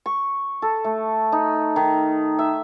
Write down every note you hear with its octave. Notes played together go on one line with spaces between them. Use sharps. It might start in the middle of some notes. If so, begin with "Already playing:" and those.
C#6
A4
A3
D#4
D#3
E5